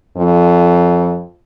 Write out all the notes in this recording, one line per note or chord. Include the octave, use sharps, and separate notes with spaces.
F2